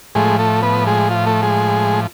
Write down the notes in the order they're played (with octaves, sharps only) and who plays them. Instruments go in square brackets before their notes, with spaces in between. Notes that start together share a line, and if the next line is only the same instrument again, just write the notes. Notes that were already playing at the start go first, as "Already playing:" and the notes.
[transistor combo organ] A2 F3 G#3 A3 G#4
A3 A4
B3 B4
G#3 G#4
F4
A3 A4
G#3 G#4